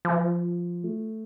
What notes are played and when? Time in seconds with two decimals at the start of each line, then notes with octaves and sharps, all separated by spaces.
0.05 F3
0.84 A3